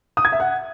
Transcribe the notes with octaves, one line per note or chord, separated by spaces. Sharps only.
D#6
G#6
E5
F#5